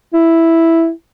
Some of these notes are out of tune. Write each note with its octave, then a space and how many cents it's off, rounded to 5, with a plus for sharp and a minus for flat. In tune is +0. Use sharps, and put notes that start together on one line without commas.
E4 +0